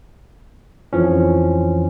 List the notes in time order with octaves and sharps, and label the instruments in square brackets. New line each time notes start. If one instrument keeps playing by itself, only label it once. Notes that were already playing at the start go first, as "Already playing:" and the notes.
[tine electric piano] F2 E3 F3 C#4